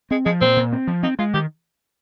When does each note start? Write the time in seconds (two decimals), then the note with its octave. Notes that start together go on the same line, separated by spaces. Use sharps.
0.11 G#3 C4
0.25 F3 G#3
0.41 A#2 C4
0.57 A#2
0.72 C4
0.87 F3
1.03 C4 D#4
1.19 G#3 F4
1.34 D#3 G4